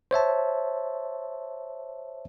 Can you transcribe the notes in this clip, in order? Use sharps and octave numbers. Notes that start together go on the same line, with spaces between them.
C5 C#5 E5 A5